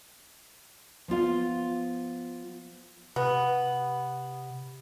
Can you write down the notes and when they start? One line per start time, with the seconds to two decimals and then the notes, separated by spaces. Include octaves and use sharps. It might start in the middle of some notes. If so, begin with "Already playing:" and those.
1.08 F3 B3 F4 F5
3.16 C3 B3